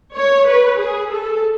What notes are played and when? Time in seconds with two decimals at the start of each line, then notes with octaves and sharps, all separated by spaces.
0.16 C#5
0.47 B4
0.79 G#4
1.10 A4